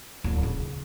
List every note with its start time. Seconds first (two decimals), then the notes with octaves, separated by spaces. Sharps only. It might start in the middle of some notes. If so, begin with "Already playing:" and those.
0.24 D1 F#3
0.43 C#3